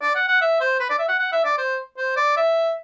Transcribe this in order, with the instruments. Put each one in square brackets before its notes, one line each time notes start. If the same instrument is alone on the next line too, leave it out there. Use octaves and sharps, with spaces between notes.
[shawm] D5
F#5
F#5
E5
C5
B4
D5
E5
F#5
F#5
E5
D5
C5
C5
D5
E5